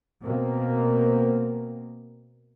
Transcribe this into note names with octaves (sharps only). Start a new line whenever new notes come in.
B2 A#3 C4